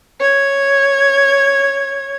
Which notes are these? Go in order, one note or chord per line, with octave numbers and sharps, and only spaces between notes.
C#5 G#6